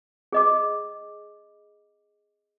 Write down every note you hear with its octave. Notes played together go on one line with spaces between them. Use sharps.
G#4 D#5 D6